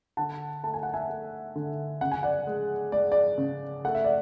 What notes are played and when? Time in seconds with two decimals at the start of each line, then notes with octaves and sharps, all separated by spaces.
0.17 D3 F#5 A5
0.63 A3 A5
0.74 G#5
0.83 F#5
0.94 E5 G#5
1.09 A3
1.55 D3
2.01 C#3 F#5
2.11 G#5
2.23 D5 F#5
2.47 G#3
2.92 G#3 D5
3.12 D5
3.38 C#3
3.85 A3 F#5
3.95 E5
4.04 D5